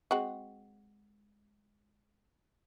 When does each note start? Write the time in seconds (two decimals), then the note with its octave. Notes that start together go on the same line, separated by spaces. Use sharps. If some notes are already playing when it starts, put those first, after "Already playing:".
0.11 G#3 C4 F#4